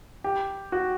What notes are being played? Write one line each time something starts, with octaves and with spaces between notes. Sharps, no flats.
G4
F#4